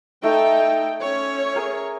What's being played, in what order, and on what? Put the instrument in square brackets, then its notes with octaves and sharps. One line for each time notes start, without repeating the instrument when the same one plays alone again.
[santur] A3 [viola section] D#4 A4 G5
[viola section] C#4 C#5
[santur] G#4 A#4